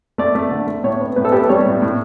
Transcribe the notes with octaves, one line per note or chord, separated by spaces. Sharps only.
A3 D5
A3
D3
A3
A2 C#5
B3
A2 B4
A4
B3 G4
A4
G3 C#5
A2
A2